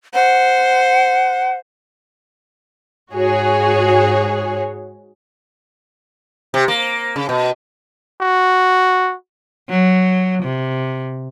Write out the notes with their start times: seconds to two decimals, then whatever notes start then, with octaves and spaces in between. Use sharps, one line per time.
0.14 C5 F#5
3.14 G#2 F#4 G#4 C#5
6.54 C3
6.68 A#3
7.16 C#3
7.29 B2
8.21 F#4
9.70 F#3
10.43 C3